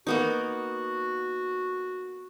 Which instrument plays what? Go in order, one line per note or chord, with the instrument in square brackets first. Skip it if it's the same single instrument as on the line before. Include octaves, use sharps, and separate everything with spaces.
[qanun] A#3 B3 D#4 [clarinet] F#4